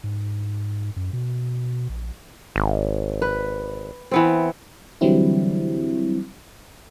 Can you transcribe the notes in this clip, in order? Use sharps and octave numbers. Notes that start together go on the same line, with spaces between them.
G#2
F#2
B2
A#1
G#1
B4
E3 B3 C4
D3 E3 F#3 G3 C4 E4